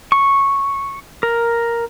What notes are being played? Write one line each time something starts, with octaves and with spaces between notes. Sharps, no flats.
C#6
A#4